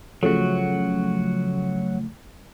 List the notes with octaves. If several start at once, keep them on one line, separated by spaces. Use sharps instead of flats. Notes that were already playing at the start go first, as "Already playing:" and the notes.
C#3 F3 F#3 A3 F#4